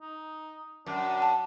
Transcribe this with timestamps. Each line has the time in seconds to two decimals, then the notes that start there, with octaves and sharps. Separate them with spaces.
0.01 D#4
0.86 F#2 D4
1.22 A5